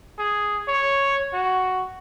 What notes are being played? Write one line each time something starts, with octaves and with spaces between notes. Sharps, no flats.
G#4
C#5
F#4